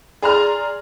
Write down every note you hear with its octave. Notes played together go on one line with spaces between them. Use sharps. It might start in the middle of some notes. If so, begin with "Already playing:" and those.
G#4 D5 A#5 C6 F6